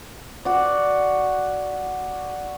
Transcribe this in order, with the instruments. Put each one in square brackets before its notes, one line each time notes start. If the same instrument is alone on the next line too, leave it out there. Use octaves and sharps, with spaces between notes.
[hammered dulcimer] F#4 D5